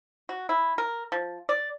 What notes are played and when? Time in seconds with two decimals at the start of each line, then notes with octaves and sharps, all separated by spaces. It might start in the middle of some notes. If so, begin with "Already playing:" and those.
0.29 F#4
0.49 E4
0.78 A#4
1.12 F3
1.49 D5